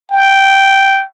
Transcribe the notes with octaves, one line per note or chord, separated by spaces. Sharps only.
G5